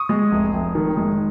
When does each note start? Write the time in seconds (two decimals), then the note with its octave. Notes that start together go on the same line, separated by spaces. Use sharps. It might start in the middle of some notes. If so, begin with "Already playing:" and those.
Already playing: C#6 D#6
0.09 G#3
0.32 F1
0.53 F1
0.75 D#3
0.97 G#3